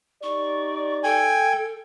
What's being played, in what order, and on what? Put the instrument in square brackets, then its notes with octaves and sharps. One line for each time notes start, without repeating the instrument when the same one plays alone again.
[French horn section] D#4 G4 D5 [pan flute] C#6
[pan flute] A4 [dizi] G5 [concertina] G#5